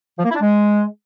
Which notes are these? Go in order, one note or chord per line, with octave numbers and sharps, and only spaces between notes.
F3
A#3
E4
D4
G#3